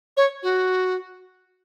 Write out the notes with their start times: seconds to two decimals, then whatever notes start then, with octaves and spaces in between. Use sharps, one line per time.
0.17 C#5
0.43 F#4